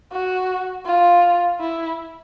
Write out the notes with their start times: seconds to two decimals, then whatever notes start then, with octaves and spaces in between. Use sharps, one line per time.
0.12 F#4
0.86 F4
1.60 E4